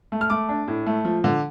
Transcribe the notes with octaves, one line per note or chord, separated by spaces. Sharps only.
A3
F6
A3 D6
D4
A2
A3
F3
D3